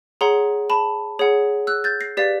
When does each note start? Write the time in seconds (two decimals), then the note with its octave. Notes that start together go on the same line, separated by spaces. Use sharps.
0.21 G#4 C#5 F#5 A#5 C6
0.70 A5 B5
1.19 G#4 C#5 F#5
1.67 E6 F#6
1.84 G6 A6
2.01 A#6 C7
2.17 G4 B4 D5 F5 A6 B6